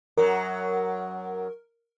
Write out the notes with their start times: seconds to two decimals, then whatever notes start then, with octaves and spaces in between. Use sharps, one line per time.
0.17 F#2 F#3 A#4